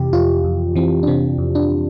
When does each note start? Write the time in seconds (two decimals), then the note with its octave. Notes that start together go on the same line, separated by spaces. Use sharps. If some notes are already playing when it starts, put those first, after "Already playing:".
Already playing: F2 C3 E3 G4
0.13 F2 F4
0.44 F2
0.75 E3 C4
1.03 D4
1.07 C3 C4
1.38 F2
1.55 D4